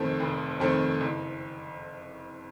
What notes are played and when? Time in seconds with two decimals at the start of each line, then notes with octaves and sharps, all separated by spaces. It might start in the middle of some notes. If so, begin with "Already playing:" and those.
Already playing: F1 F2 D#3 A3 C4
0.20 F1
0.60 F2 D#3 A3 C4
1.01 F#1